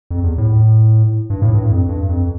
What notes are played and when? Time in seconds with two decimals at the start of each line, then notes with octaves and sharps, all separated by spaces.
0.11 F2
0.24 E2
0.38 A2
1.30 G2
1.42 A2
1.54 G2
1.70 F2
1.89 G2
2.09 F2